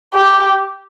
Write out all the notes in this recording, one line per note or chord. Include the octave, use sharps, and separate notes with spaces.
G4